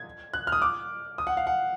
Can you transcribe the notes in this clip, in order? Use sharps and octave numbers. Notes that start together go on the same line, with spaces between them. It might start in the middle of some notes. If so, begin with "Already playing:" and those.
Already playing: G#6
F#6
F6
D#6
D6
D#6
F#5
F5
F#5